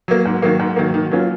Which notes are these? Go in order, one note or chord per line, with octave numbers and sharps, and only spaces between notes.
F#3 A#3
G#2
D#3 F#3 A#3
G#2
D#3 F#3 A#3
D#3
F#3 A#3 C#4 F4